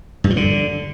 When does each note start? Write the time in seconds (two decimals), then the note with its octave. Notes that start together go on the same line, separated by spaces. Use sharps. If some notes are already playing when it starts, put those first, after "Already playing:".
0.24 G2
0.30 F3
0.37 D3